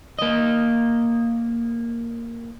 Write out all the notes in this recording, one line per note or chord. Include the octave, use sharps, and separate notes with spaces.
A#3 D#5